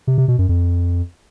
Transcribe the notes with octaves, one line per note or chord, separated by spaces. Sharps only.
C3
C3
B2
F#2
F2